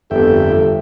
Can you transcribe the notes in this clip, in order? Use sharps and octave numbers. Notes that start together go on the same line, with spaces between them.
G1 F2 A3 G4 E5 G5